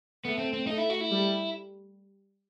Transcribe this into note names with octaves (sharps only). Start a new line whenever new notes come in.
A3 B3
C4
C4
A3 D#4
E4
F#4
E4
G3